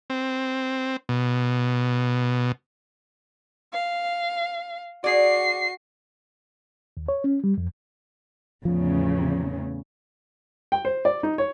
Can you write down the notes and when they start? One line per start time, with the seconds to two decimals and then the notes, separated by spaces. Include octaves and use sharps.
0.10 C4
1.09 B2
3.73 F5
5.04 F#4 G#4 D5 C7
6.97 D#2
7.08 C#5
7.24 C#4
7.44 G3
7.58 F2
8.65 E2 A2 C#3 F3
10.72 G5
10.85 C5
11.05 D5
11.23 D#4
11.38 C#5